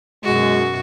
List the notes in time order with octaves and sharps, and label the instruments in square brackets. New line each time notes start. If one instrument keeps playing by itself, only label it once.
[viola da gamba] F#2 B2 F#4 [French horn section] G#3